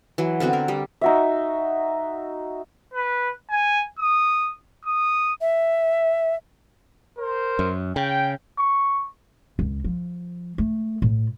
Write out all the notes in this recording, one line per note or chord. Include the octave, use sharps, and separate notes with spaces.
E3 F#3
D3 B3 C4 F#4
A#4
G3
D#4 F#4 E5
B4
G#5
D#6
D#6
E5
A#4 C5
F#2
C#3 G5
C#6
C#2
F3
A3
A2